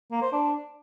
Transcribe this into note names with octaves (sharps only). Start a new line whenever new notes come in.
A#3
C5
D4